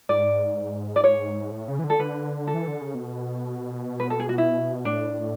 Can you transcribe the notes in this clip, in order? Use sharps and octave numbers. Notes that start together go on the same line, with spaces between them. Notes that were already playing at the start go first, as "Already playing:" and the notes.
G#2 D5
D5
C#5
A2
C#3
E3
D3
A4
D3 B4
A4
E3
D3
C#3
B2
B4
A4
G#4
F#4
E4
A2 D4